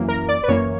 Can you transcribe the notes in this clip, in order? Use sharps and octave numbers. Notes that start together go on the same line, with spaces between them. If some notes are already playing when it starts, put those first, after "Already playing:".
Already playing: F#2 E3 A#3
A#4
D5
B4
F#2 E3 A#3 C#5